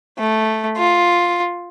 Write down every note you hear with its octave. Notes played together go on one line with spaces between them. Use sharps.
A3
F4